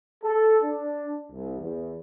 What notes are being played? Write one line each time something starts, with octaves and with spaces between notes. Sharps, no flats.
A4
D4
C2
E2